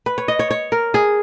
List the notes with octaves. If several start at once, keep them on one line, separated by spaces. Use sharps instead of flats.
B4
C#5
D#5
C#5
C#5
A#4
G#4